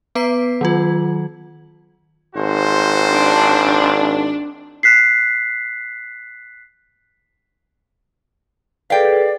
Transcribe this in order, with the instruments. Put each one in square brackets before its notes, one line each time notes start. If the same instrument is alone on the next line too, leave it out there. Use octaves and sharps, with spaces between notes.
[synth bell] B3 B4 A#5 B6 C7
D#3 F#3 F4
[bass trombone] G#1 [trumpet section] F4 F#4 C5
[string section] D4
[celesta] F#6 B6 C7
[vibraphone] G#4 A4 B4 [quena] D5 [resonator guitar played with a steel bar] F5 G5